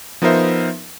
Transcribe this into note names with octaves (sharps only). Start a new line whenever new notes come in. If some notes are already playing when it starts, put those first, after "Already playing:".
F3 B3 D#4 A#4 C5 E5